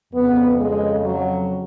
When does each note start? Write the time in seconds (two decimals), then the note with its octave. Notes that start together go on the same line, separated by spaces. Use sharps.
0.11 F2 C#3 B3
0.58 G#3
1.04 F#3